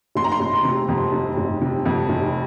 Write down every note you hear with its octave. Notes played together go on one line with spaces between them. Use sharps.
F1 C6
A#5
C6
F1
C3
F2
F1
F1
C3
F2
F1